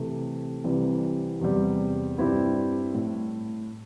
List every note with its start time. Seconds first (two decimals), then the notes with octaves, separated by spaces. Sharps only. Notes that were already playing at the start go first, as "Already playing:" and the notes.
Already playing: C3 E3 A3
0.64 C2 C3 E3 G3 C4
1.41 E2 C3 G3
2.18 G2 G3 C4 E4
2.94 A2